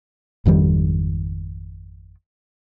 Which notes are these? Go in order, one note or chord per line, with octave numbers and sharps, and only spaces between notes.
G#1 F2 D#3 G3